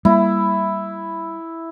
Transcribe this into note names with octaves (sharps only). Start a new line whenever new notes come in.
G3 A#3 E4